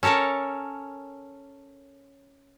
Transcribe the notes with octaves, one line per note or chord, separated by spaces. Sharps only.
C#4 A4 A#4 C#5 A5